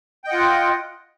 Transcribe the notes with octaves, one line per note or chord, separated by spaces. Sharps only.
F4 D#5 F#5 G5